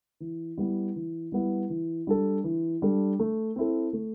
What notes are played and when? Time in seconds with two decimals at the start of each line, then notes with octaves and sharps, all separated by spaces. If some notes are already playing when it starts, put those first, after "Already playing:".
0.20 E3
0.58 G3 B3 E4
0.96 E3
1.32 G3 B3 E4
1.70 E3
2.07 G3 D4 A4
2.44 E3
2.82 G3 D4 A4
3.19 A3
3.56 C4 E4 A4
3.93 A3